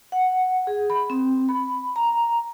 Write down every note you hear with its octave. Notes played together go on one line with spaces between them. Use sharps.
F#5
G#4
B5
C4
B5
A#5